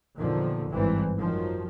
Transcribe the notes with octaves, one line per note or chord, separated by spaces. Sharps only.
E2 A#2 D3 D#3 F3
G#1 G2 E3 C4
F#2 D#3 F3 F#3